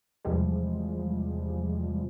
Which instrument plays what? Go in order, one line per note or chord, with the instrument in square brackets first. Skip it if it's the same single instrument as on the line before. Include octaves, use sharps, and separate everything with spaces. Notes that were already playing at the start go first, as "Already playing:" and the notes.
[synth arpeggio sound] E2 C3 F3 G3 G#3